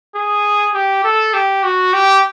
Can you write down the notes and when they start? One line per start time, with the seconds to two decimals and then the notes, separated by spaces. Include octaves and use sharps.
0.15 G#4
0.74 G4
1.04 A4
1.34 G4
1.64 F#4
1.93 G4